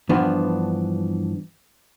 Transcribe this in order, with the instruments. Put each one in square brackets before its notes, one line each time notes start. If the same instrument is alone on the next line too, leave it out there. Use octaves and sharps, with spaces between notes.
[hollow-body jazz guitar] G2 E3 F3 B3 D4